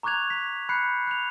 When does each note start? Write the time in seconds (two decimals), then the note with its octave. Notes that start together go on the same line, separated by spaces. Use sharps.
0.03 A#5 C#6 D6 F#6 G#6 F7
0.30 B6
0.69 B5 F#6 G6 C7 C#7
1.07 F#6 F7